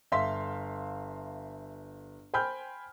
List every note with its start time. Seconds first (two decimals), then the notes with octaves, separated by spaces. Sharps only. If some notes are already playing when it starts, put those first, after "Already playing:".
0.12 G1 E5 F5 C6 B6
2.34 C5 G5 G#5 B5 F6 G6